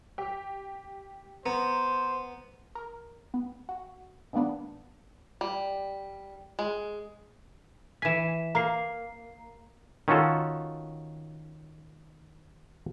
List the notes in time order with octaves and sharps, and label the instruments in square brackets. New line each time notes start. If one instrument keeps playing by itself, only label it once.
[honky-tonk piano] G4
[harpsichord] B3 [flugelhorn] C5 [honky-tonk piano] A#5
[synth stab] A#4
B3
F#4
G#2 D#3 A#3 B3 D4
[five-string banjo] G3
G#3
[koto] E3 G#5 [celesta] B6 E7
[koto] A#3 [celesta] A#5 C7
[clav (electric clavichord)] D#3 C#4 F4 F#4 A4